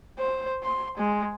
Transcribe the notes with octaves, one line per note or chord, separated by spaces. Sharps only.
C5
C6
G#3